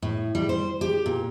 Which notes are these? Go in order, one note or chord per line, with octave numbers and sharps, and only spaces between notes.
A2
G3
C5
G4
A#2